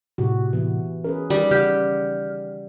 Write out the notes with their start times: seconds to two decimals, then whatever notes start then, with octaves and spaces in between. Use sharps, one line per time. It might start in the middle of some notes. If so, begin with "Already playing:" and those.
0.18 A2 C3 F#4 G4
0.53 E3 B3
1.04 C#4 G#4 A#4 B4
1.30 D#3 G3
1.51 C#3 G4 F#5 F6 G6